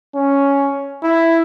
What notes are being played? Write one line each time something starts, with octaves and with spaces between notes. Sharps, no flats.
C#4
E4